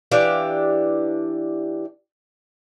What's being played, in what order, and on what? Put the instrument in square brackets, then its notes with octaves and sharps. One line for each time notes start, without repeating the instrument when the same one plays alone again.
[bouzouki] E3 D4 G4 F5